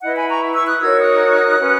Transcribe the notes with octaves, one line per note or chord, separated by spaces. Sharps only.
E4 B4 D#5 F#5
G#5 B5
A#5 C#6
C#6 E6
D#6 F#6
D#4 F#4 A#4 C#5 E6 G#6
D#6 F#6
C#4 F#4 B4